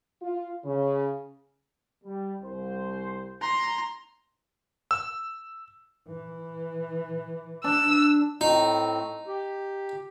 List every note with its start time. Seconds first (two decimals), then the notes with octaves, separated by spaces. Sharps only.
0.22 F4
0.65 C#3
2.04 G3
2.42 C2 C5
3.42 A#5 C6
4.91 E6
6.08 E3
7.64 D4 E6
8.41 A2 A3 C4 D#4
9.27 G4